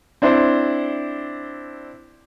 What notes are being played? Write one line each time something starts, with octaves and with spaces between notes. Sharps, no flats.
C4 D4 E4 C5